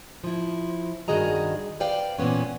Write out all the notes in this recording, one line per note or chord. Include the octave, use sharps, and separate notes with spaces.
F3 E4
G2 D#3 F#4 G#4 D#5 A#5
B4 C5 D5 F5 G5
A#2 E3 B3 C#4